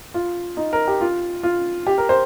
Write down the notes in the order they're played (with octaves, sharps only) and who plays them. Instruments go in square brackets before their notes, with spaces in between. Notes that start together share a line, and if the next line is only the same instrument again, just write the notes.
[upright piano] F4
D#4
A#4
G4
F4
F4
G4
A#4
C5